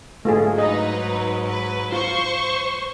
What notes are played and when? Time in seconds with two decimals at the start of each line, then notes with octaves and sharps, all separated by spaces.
0.25 G#2 F#3 A3 F4 G#4
0.58 D#4 B4 D#5
1.47 B4
1.92 F4 C5 C6 C#6